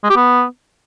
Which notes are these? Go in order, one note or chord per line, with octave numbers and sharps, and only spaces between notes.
G#3
G4
B3